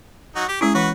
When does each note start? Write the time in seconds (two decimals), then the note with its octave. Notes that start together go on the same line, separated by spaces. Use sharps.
0.36 F#3 D#4 F#4
0.48 G4
0.61 G#3 C#4 E4 G#4
0.75 E3 F#4 B4